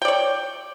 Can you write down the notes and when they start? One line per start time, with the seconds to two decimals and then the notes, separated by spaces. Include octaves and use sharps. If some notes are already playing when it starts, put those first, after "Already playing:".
0.02 G5
0.05 D5
0.08 C#5